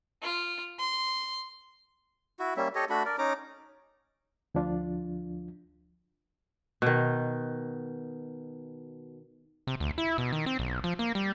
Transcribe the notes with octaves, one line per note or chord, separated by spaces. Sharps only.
F4
C6
E4 F#4
G3 A#3 C#4 E5
G4 A4 C#5 D#5
A3 D4 F#4 B5
A#4 D5
C#4 D#4 A#5 D6
D2 F3 D4 F4
B2 D#3
C3
D2
E4
B2
D#3
C4
B1
F3
A#3
G3